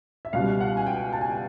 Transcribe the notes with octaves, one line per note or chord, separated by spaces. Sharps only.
E5
C#2 B2 G3 F5
F#5
G#5
G5
A5
G#5
G5